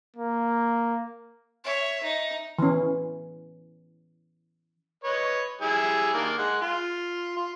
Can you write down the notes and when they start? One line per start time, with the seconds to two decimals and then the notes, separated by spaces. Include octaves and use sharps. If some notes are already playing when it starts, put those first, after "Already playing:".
0.17 A#3
1.65 C#5 E5
2.03 D#4
2.59 E3 C#4
5.04 B4 C#5 D#5
5.61 G3 E4 G#4
6.14 D#3 A#3 D4
6.38 G#3 F#5
6.61 F4
7.36 F4